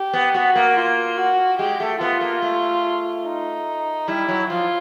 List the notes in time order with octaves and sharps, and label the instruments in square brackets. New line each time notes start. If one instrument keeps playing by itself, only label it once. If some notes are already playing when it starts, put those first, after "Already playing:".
Already playing: [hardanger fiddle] G4
[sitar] B3
[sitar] B3 [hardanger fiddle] F#4
[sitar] A#3
[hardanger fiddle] F4
F#4
[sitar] G#3 [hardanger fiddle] G4
[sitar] A3
[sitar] B3 [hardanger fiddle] F4
[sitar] A#3
A3
[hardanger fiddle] D#4
[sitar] G3 [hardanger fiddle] E4
[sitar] F#3
[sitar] F3 [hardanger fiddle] F4